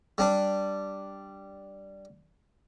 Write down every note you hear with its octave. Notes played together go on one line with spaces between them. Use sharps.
G3 D4